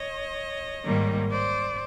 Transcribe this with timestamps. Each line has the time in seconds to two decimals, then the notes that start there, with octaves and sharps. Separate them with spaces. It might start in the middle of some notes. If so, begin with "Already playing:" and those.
Already playing: C#5 D#5
0.84 G#2 D#3 G3 A#3
1.30 C5 D5